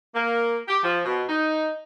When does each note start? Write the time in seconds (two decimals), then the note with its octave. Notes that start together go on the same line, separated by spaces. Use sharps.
0.15 A#3
0.68 G4
0.83 F3
1.05 B2
1.28 D#4